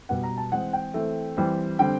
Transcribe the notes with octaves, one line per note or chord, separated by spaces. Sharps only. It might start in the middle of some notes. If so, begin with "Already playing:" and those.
B2 G3 B3 F#5
A#5
A5
E3 G#3 C4 F#5
G5
E3 A3 C4
E3 G3 C4
D3 G3 C4 G5